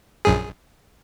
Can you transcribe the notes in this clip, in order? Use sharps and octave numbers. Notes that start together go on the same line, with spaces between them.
A#1 F#2 G#4